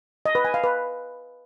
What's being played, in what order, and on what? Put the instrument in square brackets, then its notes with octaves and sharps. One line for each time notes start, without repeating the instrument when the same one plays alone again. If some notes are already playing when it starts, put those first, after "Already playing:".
[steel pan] D#5
B4
G#5
F5
B4